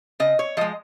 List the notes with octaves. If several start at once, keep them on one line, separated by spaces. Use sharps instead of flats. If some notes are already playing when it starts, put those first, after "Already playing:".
C#3 D#5
C#5
F3 G#3 D#5